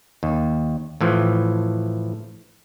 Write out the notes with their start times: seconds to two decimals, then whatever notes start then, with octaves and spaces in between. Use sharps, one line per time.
0.23 D#2
1.01 A2 E3 F3